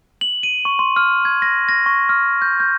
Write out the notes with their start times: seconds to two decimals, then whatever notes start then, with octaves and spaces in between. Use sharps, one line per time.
0.21 F#7
0.43 D#7
0.65 C#6
0.79 C6
0.96 F6
1.25 G#6
1.42 A#6
1.69 A#6
1.86 C#6
2.09 F6
2.42 G6
2.60 G6